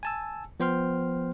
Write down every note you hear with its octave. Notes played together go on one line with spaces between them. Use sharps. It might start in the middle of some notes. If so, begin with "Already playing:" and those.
G#5 A5 E6
F3 B3 C5 G5 C6 F6